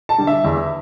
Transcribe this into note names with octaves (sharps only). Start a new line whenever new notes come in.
A5
D3 G3
E5
E2